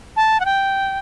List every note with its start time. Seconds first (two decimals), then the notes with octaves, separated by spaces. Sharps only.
0.16 A5
0.40 F#5
0.45 G5